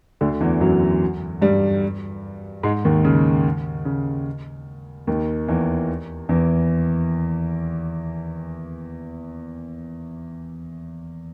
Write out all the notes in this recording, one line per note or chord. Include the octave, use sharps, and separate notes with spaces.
D2 D3
E2 E3
F#2 F#3
G2 G3
G#2 G#3
D#2 D#3
C#3
C#3
D#2 D#3
E2 E3
E2 E3